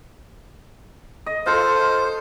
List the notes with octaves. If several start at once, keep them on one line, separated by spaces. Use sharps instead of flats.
D#5
F4 A4 C5